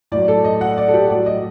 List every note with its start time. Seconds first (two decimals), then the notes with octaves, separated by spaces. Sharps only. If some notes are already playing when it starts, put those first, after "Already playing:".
0.12 A2 F#3 D5
0.28 A4
0.44 D#5
0.61 F#5
0.78 D5
0.88 A4
0.94 G4
1.10 A2 F#3 D5
1.26 D#5